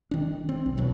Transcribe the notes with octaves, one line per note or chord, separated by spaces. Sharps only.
D#3 D4
C4
B1
D#1 E2 B2 F#3